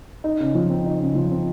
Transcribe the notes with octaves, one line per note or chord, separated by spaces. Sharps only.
D#4
C#3
F3
C4
D#4
C#3
F3
C4